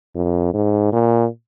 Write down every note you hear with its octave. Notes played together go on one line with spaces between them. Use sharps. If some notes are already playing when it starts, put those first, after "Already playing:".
F2
G#2
A#2